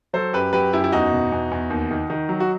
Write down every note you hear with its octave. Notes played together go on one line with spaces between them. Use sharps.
F#3 A4 C5
F#2 G4 B4
F#3 G4 B4
F#2 E4 G4
E4
E2 D#4 F#4
B2
E2
E2
D#2
D#3
D#3
F#3
F#4